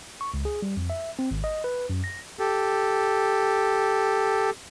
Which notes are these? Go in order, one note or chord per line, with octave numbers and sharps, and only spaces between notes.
C#6
C#2
G#4
G3
F2
E5
C4
G#1
D#5
B4
F#2
A#6
G4 A4